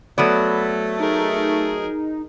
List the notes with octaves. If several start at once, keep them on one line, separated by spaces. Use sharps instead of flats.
F#3 A3 B3 D5 B5
D#4 G#4 A#4